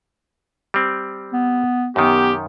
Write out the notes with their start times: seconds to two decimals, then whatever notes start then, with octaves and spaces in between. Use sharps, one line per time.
0.74 G3 C4
1.33 B3
1.96 F#2 D#3 B3 G4